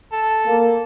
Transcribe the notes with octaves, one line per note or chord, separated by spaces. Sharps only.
A4
A#3